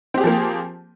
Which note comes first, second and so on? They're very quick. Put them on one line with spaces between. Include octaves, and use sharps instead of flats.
C4 G4 G#4 F3 A#3